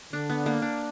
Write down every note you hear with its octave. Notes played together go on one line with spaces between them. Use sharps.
D3 D4
B3
A#3
D4